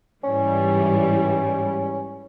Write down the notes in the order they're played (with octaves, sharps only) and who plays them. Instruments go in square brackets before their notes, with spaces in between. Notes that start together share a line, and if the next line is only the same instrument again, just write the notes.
[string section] G#2 E3 G3 [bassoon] C#4